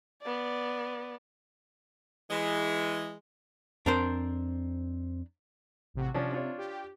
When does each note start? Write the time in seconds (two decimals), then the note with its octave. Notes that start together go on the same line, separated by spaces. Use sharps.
0.22 B3 D5
2.30 E3 G#3
3.86 F2 C4 D4 A#4 C5
5.94 A1 C3 F#4
6.14 C3 F3 C#4 D4
6.32 D4 F4 C#5
6.58 G4